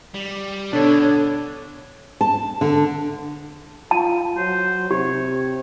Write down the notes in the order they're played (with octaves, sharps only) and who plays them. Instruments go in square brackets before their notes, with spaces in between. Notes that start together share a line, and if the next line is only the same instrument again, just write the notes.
[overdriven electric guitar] G3
[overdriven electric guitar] B2 [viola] D3 [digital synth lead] D4 [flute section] C#5
[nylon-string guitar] A5
D3
[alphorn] F4 [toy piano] A5
[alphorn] F#3 [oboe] C5
[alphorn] C3 [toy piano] G4 [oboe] C#5